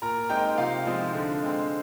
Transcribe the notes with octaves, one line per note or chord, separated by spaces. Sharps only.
A#2 A#4 A#5
G#3 C4 D#4 G4 G5
C3 F4 F5
F3 G#3 C4 D#4
D3
G#3 C4